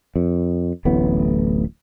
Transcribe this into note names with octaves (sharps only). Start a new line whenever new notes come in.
F2
D1 A1 A2 B3